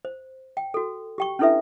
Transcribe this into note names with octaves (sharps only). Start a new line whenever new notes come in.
C5
G5
F#4 A4
G4 G5 C#6
C#4 D4 E4 A4 B4 E5